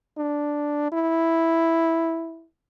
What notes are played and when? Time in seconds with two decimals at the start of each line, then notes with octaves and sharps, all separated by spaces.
0.18 D4
0.92 E4